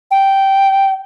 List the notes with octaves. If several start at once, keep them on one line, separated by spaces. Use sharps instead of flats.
G5